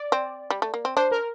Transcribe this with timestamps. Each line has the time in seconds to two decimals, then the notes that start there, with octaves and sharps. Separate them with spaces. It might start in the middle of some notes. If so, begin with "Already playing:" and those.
Already playing: D5
0.12 C4
0.50 G3
0.62 A3
0.74 A#3
0.85 C4
0.96 D4 C5
1.11 A#4